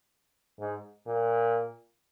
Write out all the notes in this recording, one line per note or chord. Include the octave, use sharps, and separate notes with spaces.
G#2
A#2